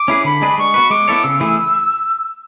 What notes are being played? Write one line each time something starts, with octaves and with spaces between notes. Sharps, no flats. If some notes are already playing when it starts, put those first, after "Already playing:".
Already playing: D6
C#4 E4 G#4 B4
D3 B5
G#3 D4 G#4 B4
G#3 C#6
B3 F#4 B4
G#3 D6
B3 E4 A4 C#5
C#3 E6
E3 A3 E4 G#4